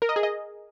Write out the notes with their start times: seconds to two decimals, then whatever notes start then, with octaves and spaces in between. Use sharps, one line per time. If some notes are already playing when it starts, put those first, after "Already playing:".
0.02 A#4
0.09 D#5
0.16 G#4
0.23 D#5